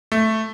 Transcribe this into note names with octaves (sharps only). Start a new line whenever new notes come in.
A3